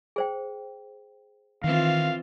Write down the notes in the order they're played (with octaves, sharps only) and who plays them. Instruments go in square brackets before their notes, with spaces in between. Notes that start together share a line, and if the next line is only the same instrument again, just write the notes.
[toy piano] G#4 C5 G5
[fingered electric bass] D#3 [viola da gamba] E3 C4 F4 [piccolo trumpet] F5